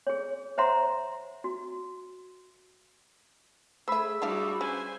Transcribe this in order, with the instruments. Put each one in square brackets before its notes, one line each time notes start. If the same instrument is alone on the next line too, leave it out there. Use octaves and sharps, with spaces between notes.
[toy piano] G#4 C#5
C5 C#5 E5 F#5 A#5 C6
F#4
[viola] A3 [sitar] G#4 [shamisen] C5 E5 [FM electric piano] B5 E6
[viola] G3 F#4 [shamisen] D4 E4 F5
[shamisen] C#4 [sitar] B4 [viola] C5 G#5